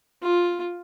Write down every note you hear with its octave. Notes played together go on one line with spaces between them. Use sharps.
F4